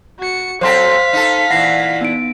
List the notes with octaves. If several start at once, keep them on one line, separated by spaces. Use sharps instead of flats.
F#4 C#7
F#3 C4 A4 C5 F5 C6 B6
D#4 A4
A#2 E3 E4 F#5 A#6 C7
B3 D#4 D7